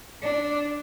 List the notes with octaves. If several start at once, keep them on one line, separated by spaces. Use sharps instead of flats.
D4